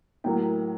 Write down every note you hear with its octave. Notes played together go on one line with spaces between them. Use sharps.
A2 F#3 A#3 G5